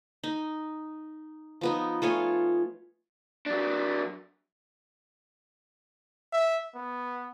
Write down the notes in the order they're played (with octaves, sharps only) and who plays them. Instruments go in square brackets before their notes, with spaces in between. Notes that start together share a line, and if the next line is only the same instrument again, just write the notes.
[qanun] D#4
F3 B3 D#4
A3 F4 C#5 G#5
[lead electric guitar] F#3 D4
[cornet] E5
B3